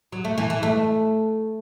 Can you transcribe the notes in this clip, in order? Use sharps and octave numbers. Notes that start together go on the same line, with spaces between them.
F#3
A3
E3
E3
A3